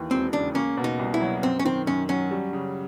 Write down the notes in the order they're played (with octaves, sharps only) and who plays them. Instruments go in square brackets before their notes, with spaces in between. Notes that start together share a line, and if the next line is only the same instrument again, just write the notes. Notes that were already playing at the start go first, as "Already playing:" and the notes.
Already playing: [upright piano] D#2 E3
[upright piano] E1 [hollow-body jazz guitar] C4
[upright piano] C#3 [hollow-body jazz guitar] D4
[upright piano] A#3 [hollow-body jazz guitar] C#4
[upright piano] B2
[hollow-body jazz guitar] D#4
[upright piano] C2
[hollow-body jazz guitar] E4
[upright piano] F#3
[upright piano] F#2 [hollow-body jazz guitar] C4
[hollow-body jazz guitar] C#4
[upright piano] D#3 [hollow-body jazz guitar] C4
[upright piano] F#2 [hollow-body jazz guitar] C#4
[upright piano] F#3 [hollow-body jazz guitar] C#4
[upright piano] G3
C#3